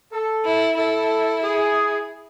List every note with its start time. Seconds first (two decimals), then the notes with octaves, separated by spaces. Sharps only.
0.13 A4
0.45 E4
0.77 E4 A4
1.43 G#4